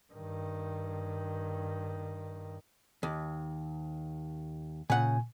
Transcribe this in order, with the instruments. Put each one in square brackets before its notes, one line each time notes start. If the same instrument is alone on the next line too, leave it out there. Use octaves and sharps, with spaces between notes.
[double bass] G2 D#3
[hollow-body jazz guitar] D#2
[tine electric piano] A#2 G#5 [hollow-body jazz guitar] C#3 F#5